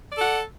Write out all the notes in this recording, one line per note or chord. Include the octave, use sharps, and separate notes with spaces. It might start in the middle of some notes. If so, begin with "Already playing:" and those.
A4 D5 F#5